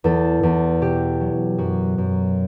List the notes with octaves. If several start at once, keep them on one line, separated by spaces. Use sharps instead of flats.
E2 A4
E2
B2 G4
F#3
F#2 F#4
F#2